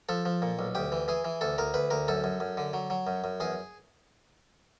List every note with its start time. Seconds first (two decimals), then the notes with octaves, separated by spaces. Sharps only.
0.09 F3 A4
0.25 F3
0.42 A#2
0.59 B1
0.75 D2 G4
0.92 E3
1.08 E3 G#4
1.25 E3
1.41 D2 A4
1.58 D2 A#4
1.74 D2 B4
1.90 D2 A#4
2.08 F#2 A4
2.24 F#2
2.40 F#2
2.57 D3
2.73 F#3
2.90 F#3
3.07 F#2
3.24 F#2
3.40 E2 G#4